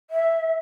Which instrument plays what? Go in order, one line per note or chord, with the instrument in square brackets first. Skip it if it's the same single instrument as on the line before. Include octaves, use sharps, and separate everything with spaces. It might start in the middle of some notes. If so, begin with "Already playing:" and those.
[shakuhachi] E5